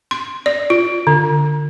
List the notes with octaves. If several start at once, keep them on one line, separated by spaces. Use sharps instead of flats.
C6
D5
F4
D3